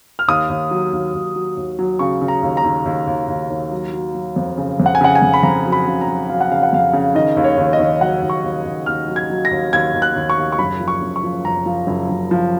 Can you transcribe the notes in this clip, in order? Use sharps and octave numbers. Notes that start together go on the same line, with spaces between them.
F6
D#2 D#6
D#2
F#3
D#2
D#2
F#3
D#2
F#3
C#3 C#6
C#3
A#5
D#2
A#5
D#2
D#2
D#2
D#2
D#2
F#3
F#3
F#3
F2
C#3
F2
F#5
G#5
C#3 F#5
G#5
F2
B5
F2 A#5
F#3
B5
C#3
A#5
F#3
F#3 F5
F#5
C#3 F5
F#5
F2 F5
C#3
D#3 D#5
D#2
C#5
D#2
D#5
D#2
F#3 F#5
D#2
C#6
D#2
D#2
D#2 F6
F#3
G#6
F#3
A#6
D#2
D#2 G#6
D#2
F#6
D#2
C#6
D#2
C#6
F#1 B5
F3
C#6
F#1
C#6
F3
F#1 A#5
F3
F#1
F#1
F3